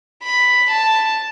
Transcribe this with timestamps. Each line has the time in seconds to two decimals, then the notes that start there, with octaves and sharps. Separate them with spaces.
0.23 B5
0.70 A5